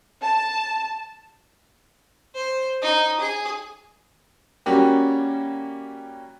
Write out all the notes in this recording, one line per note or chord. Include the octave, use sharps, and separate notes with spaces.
A5
C5
D#4
G#4
G3 A#3 C#4 F#4 G4